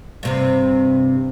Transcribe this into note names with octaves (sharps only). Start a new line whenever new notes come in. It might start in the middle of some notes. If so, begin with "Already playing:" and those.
G2 C3 C4